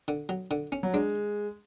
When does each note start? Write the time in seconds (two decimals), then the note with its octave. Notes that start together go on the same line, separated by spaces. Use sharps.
0.08 D3
0.29 F#3
0.51 D3
0.72 C#4
0.83 F#3
0.94 G#3 D4